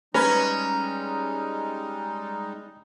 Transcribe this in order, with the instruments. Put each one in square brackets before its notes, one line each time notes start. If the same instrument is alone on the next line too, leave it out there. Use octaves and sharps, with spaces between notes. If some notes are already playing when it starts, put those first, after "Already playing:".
[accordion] G3 G#3 D#4 [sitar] C#4 [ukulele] B4 [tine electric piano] A#5